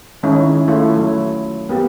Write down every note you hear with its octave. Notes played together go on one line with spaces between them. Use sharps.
D#3 G#3 C#4 D#4 E4
A3 E4 F4
F#3
A#3 B3 G4